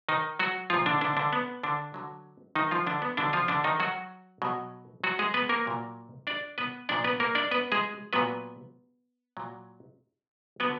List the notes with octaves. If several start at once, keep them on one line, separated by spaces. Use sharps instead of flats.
D#3 D#4
F#3 F#4
A#2 F3 F4
D3 D4
D3 D4
D3 D4
B3
D3 D4
D3 F#3
D#3 D#4
F3 F4
D3 D4
B3
B2 D3 F#3 D4
F3 F4
D3 D4
D#3 D#4
F#3 F#4
B2 F#3
F#3 F#4
G#3 G#4
B3 B4
A#3 A#4
A#2 F#3
D4 D5
B3 B4
A#2 F3 D4 D5
B3 B4
A#3 A#4
D4 D5
B3 B4
G#3 G#4
A#2 F#3 B3 B4
A#2 F#3
D3 F#3 B3 B4